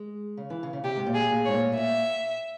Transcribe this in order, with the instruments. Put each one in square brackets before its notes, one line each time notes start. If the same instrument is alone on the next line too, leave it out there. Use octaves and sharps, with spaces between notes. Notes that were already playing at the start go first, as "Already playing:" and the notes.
Already playing: [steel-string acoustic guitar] G#3
C#3
E3
C#3
C#3
[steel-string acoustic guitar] C3 [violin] G4
[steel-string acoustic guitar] G#2
A#2
[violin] G#4
[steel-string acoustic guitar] A#2
[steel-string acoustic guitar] G#2 [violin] C#5
[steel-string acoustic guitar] A#2
[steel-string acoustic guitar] A#2 [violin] E5